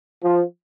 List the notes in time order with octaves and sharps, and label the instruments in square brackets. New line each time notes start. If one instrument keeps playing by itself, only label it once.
[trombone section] F3